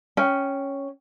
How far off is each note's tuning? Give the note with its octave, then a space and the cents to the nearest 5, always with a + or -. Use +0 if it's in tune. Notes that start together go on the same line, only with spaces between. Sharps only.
C#4 +0 G5 +0